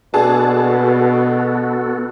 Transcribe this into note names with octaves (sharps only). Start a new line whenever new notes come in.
B2 B3 D4 F#4 G#4 A4 A5